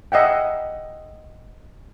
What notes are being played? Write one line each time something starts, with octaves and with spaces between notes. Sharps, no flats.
D#5 E5 F#5 G5